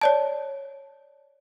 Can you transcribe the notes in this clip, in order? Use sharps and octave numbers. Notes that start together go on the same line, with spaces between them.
C#5 D5 A5